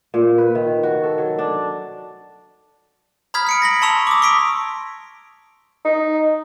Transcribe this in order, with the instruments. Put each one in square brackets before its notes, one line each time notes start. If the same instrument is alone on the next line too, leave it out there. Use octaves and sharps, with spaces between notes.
[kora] A#2
B4
D#3
F#4
A4
F#3
D4
[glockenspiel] A#5 B5 D#6 F6 G#6 B6
F6 C#7 D7
A#6 B6 F#7
A5 A#5 C6 C#6 E6 F7
D6 D#6
C#6 E6 B6 D7
[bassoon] D#4